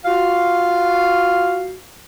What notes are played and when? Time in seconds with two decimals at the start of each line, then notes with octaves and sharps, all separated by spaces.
0.05 F4 F#4 F5